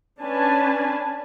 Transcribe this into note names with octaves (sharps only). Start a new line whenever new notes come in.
C#4 D4 B4 G#5 A5